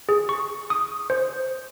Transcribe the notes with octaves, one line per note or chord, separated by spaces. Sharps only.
G#4
C#6
D#6
C5